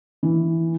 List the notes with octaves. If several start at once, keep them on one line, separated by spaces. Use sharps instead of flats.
E3